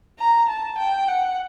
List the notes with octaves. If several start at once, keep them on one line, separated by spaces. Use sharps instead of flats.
A#5
A5
G5
F#5